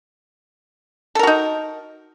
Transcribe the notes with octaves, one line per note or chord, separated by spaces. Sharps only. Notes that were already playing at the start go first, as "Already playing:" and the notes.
D#4 F#4 A4 A#4